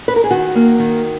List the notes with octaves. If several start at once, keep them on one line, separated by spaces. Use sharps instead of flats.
B4
A#4
G#4
D#3 F#4
A#3
D#3